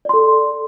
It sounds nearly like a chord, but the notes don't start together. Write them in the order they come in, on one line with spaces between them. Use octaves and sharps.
D5 C6 A4